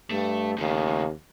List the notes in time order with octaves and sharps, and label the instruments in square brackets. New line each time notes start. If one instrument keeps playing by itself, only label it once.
[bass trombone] G2 [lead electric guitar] A3
[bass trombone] D#2 [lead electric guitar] C#3 A3